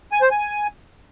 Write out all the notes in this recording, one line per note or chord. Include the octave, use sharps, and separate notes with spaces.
G#5
C5
G#5